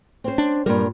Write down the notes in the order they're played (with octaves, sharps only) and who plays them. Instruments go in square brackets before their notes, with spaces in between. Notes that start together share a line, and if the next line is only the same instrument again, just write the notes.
[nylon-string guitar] C4 C#4 C5
[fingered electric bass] D4
[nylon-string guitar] G2 A#2 A#4 [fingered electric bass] G3